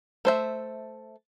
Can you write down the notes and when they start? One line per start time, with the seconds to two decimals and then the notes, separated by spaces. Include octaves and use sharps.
0.25 A3 C5 E5